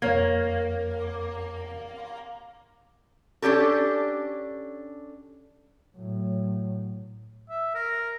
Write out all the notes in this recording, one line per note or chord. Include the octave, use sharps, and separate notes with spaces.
F2 A#3 C#5 G#6
C#4 D4 G4 A4
A2 F#3
E5
A#4